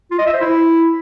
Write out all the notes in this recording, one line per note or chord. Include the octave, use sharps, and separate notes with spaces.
F4
D#5
E5
C5
E4